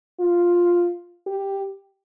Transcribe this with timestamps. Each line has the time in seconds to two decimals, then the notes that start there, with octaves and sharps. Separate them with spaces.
0.21 F4
1.27 G4